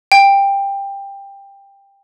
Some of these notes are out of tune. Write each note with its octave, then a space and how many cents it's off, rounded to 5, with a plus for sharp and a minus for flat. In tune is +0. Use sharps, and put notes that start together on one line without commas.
G5 +15